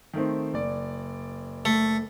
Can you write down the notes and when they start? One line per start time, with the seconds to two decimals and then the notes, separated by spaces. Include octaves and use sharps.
0.13 D#3 A3 C4
0.53 F#1 D5
1.65 A3